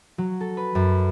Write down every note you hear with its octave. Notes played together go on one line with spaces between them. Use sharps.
F#3
A4
B4
F#2